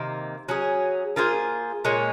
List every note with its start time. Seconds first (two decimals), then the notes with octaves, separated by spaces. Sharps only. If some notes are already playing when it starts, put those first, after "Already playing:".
Already playing: C3 D#3 A#3
0.49 F#3 C#4 G#4
1.16 A#3 F4 G#4 C5
1.84 A#2 G#3 C#4